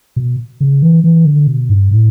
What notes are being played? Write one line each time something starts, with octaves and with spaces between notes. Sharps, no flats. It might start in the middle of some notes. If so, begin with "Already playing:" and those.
B2
C#3
E3
E3
D3
B2
G2
A2